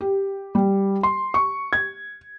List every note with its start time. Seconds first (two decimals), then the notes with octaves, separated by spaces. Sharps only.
0.01 G4
0.55 G3
1.03 C6
1.34 C#6
1.73 G#6